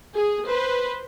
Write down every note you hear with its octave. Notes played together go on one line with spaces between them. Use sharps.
G#4
B4 C5